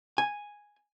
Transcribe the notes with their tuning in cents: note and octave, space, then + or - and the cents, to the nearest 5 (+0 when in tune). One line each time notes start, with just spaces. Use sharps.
G#5 -5